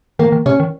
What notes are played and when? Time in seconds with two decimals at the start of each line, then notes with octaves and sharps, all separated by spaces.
0.19 D#3 A#3
0.32 D#3
0.46 C3 C#4
0.60 D#3